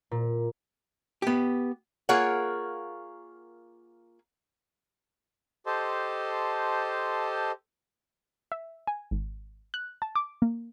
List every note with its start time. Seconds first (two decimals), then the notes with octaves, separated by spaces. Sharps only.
0.11 A#2
1.22 B3 G4
2.09 A#3 F4 G#4 A#4 C#5 F#5
5.66 G4 A4 C5 D#5 A5 C6
8.52 E5
8.87 G#5
9.11 G#1
9.74 F#6
10.02 A5
10.15 D6
10.42 A#3